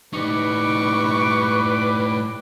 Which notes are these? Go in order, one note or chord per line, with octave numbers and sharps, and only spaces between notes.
A2 G3 D#4 B4 C#6 D6